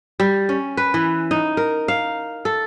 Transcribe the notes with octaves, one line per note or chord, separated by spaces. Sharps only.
G3
C#4
B4
E3
D#4
A#4
F5
A4